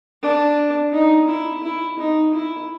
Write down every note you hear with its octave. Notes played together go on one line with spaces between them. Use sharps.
D4
D#4
E4
E4
D#4
E4